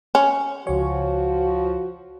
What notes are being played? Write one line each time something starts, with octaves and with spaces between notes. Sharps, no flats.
C#4
C#2 F3 F#4 C#5